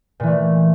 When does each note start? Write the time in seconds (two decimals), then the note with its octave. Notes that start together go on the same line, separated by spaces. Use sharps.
0.20 A#2
0.23 E3
0.27 A3